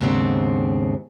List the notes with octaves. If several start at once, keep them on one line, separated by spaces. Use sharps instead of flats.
D#2 G#2 C#3 B3 C4 D4